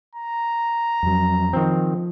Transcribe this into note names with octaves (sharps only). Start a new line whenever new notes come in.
A#5
F2 F#3
D#3 F3 C4